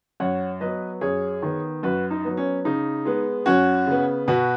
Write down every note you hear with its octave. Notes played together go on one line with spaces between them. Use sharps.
F#2 C#5 F#5
F#3 B3 B4 D#5
F#2 G#4 C#5
D#3 B3
F#2 F#4 B4
D#4
F#3 B3
C#4
C#3 D#4
G#3 B3
F#2 C#4 F#4
C#3 B3
B2 F#4 B4